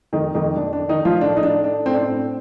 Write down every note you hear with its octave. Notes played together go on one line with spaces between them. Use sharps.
F2 D#3 D#4
F2 D#3 D#4
F2 D4
D4
D#3
D#3 D#4
D#3
F3 F4
A2 D4
D#4
A2 D4
A3 D4
A2 C4
D4
C4
A2